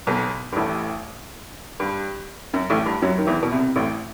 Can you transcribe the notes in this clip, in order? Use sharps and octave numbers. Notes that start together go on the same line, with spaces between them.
B1 B2
G2
A1 A2
G2
F#2
A1 A2
G2
F#2 F#3
D#3
E2 E3
B2
C2 C3
A1 A2